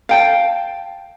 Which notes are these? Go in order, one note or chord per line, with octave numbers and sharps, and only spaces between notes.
F5 G5 A5